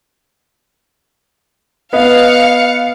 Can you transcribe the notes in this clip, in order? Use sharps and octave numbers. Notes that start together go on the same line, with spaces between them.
B3 B4 D#5 F5 C#7